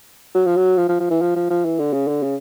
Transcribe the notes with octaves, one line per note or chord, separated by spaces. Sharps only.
F#3
F3
F#3
F3
F3
F3
E3
F3
F3
F3
E3
D3
C#3
D3
C#3